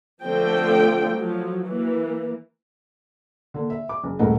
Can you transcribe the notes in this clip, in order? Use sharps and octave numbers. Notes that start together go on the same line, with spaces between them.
D3 F3 A3 C4 G5
F3 F#3
E3 A#3
D3 A#3 D4
E5
D6
F#1
D#1 G#1 A2 A#4 D#5 F#5